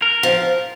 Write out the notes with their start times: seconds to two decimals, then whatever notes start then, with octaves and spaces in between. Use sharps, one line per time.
0.02 A#4
0.23 F3